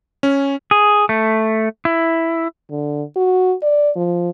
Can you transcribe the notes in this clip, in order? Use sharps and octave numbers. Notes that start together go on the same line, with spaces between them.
C#4
G#4
A3
E4
D3
F#4
D5
F3